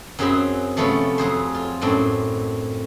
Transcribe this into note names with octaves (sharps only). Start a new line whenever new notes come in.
F#2 F#3 C4 G#4 G5 B5
C3 F3 A3 B3 C#4
F2 F#3 G#4 C5
F4
F#2 A2 C4 D4